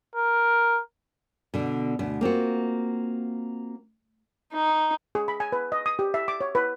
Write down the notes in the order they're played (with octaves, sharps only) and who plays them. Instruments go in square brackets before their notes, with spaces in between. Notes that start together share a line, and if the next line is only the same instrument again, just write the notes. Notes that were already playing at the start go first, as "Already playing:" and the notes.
[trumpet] A#4
[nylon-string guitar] B2 D3
D2 B2
A#3 C4 F4 F#4
[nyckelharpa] D#4
[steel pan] G#4
B5
G#5
B4
D#5
D#6
G4
E5
D6
C#5
B4